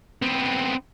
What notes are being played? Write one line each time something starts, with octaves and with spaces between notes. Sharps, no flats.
B3 C4